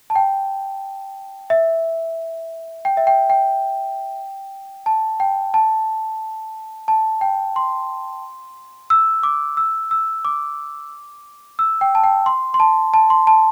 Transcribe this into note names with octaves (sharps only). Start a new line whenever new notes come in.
A5
G5
E5
G5
E5
G5
G5
A5
G5
A5
A5
G5
C6
E6
D6
E6
E6
D6
E6
G5
A5
G5
C6
C6
A5
A5
C6
A5